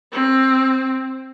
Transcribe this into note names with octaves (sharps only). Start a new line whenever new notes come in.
C4